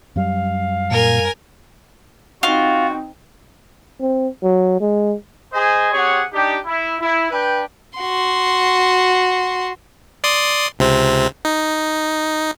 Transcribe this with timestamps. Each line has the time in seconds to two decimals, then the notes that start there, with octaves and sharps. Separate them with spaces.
0.16 F#2 F#3 G3 F5
0.91 A#2 A#4 G#5
2.43 C4 D#4 F4 F#4
4.00 C4
4.43 F#3
4.80 G#3
5.53 G#4 C5 D#5 G#5
5.92 C4 G4 G#4 C#5 F#5
6.33 D4 D#4 G4
6.64 E4
7.00 E4
7.31 D4 B4 G5
7.98 F#4 C6
10.24 D5 C6 D#6
10.79 C#2 C3 C4
11.45 D#4